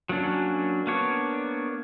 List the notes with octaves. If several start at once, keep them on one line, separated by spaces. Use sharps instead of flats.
F#3 A#3 C#4 D4
A#3 B3 D4 C#5